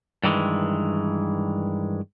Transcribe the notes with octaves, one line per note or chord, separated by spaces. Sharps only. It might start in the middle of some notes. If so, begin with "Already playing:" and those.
G2 D#3 E3 G#3